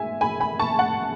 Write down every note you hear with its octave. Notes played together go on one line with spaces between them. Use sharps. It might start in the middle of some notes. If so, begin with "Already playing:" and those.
Already playing: G#2 G#3 E5 G#5
G#5 B5
G#5 B5
A5 C#6
F#5 A5